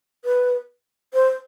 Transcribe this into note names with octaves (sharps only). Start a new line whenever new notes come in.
B4
C5